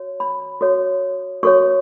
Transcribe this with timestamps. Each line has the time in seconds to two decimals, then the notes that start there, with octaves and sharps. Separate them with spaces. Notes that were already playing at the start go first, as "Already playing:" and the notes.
Already playing: F#4 C#5
0.20 B5
0.61 F#4 A4 C#5
1.43 F#4 A4 C#5 C#6